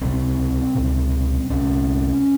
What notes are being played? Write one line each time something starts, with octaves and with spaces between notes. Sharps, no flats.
C#2 C3 C4
C#2 C3
C2 C3 C#4